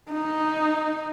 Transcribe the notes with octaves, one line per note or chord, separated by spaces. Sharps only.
D#4